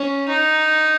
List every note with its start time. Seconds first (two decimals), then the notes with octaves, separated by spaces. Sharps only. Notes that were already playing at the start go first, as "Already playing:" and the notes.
Already playing: C#4
0.28 D#4